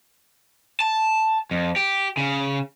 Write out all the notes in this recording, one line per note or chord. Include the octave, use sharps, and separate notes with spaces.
A5
F2
G4
C#3